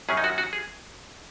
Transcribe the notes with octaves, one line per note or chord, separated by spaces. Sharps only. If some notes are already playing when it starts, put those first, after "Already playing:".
F#2 D#3 F#3 C#4 G#4
D#4
F#4
F#4
G#4